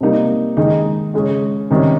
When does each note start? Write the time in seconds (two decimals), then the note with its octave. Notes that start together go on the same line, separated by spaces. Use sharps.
0.01 C3 G3 A#3 D#4
0.57 D#3 G#3 D#4
1.14 C#3 G#3 C#4
1.71 C3 D#3 G3 C#4